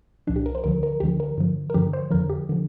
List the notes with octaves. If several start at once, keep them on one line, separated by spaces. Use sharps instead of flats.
C2 A#2 F3 D4
G4
A#4
C5
D2 D3 F3 A#4
A#4
D2 D3 F3 G4
A#4
G2 D3 F3
A#4
G2 D3 F3 G4
C5
F2 D3 F3 A#4
G4
D3 F3